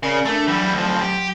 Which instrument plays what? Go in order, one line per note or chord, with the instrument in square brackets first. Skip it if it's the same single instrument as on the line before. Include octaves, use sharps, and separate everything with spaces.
[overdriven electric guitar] C#3 [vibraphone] A#4 D5
[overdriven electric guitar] A3 [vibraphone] D4 E6
[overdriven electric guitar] E3 G3 [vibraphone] F#3
[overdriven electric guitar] D2 F3
G4